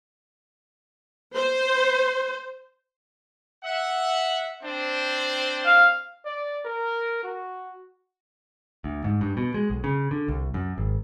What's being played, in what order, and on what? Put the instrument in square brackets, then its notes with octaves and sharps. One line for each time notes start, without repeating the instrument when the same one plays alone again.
[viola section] C5
[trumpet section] E5 F#5
C4 D4 C5
[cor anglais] F5
[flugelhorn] D5
A#4
F#4
[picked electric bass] D2
G#2
G2
B2
G#3
B1
C#3
D3
C2
F#2
G#1